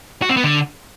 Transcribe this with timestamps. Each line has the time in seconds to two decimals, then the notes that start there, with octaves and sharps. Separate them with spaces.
0.22 F#4
0.29 C4
0.37 B3
0.44 D3